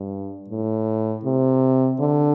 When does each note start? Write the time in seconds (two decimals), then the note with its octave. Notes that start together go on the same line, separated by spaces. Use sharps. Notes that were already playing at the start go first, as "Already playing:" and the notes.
Already playing: G2
0.49 A2
1.25 C3
2.00 D3